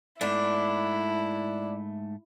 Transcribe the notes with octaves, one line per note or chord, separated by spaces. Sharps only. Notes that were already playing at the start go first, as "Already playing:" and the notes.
G#2 A3 B3 D4 E4